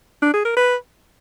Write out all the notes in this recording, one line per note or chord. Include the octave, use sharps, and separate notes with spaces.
D4
G#4
A#4
B4